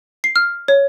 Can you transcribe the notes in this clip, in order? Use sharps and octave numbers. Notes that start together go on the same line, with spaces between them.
C7
F6
C#5